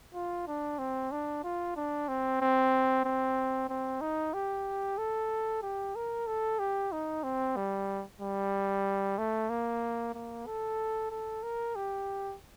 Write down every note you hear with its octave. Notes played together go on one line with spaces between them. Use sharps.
F4
D4
C4
D4
F4
D4
C4
C4
C4
C4
D#4
G4
A4
G4
A#4
A4
G4
D#4
C4
G3
G3
A3
A#3
A#3
A4
A4
A#4
G4